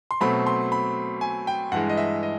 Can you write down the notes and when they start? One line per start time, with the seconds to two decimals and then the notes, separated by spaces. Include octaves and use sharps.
0.11 C6
0.21 B2 F#3 A3 C4 B5
0.47 C6
0.72 B5
1.21 G#5
1.47 G5
1.72 G2 E3 G#3 F#5
1.89 D#5
1.97 E5
2.23 D#5